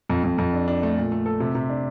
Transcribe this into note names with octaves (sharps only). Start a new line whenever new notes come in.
F2
F2
F2
D4
D4
A3
A#2
A3
A4
C3
C3
D4